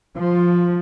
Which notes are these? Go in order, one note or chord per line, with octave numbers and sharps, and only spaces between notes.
F3